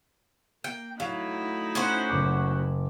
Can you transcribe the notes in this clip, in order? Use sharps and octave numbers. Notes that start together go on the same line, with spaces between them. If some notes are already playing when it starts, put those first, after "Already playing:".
A#3 G5
F#3 A3 D#4 E4 F5
C#4 F#4 C5
F#1 D6